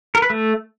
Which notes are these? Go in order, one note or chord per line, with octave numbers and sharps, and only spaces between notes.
A#4
B4
A3